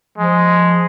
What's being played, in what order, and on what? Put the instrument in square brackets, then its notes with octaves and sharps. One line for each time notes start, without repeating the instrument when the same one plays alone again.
[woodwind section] F3 [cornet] G#3